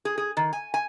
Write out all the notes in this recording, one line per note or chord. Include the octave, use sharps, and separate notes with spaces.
G#4
G#4
D#3
G#5
G#5